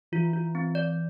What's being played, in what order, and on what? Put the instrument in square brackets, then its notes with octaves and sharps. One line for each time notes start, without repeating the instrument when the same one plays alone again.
[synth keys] E3 [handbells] F4
[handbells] F4
C4
D5